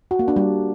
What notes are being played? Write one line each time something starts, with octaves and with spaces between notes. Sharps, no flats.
F#4
A#3
D4
G3